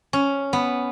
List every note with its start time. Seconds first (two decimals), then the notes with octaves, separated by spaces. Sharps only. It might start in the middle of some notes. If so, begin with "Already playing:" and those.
0.13 C#4
0.53 B3